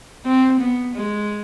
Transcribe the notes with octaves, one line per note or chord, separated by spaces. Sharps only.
C4
B3
G#3